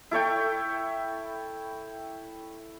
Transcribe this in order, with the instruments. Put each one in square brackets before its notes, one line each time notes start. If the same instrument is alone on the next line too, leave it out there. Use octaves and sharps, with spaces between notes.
[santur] E4 A4 C#5 G5